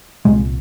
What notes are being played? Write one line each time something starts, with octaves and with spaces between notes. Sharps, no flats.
C2 A#2 G#3